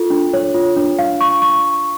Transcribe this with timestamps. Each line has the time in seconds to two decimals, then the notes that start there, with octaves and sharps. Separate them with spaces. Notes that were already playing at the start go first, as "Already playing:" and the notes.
Already playing: F4 A4
0.10 D4
0.33 C#5
0.54 F4
0.76 D4
0.99 F5
1.21 C#6
1.42 C#6